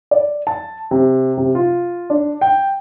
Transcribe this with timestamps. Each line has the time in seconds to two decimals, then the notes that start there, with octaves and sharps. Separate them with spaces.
0.11 D5
0.47 A5
0.91 C3
1.38 C3
1.55 F4
2.10 D4
2.41 G5